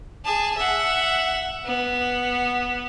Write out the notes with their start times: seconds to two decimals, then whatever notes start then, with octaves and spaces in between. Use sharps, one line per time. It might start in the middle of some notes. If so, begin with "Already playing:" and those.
0.25 G#4 A5
0.57 E5 F#5
1.65 B3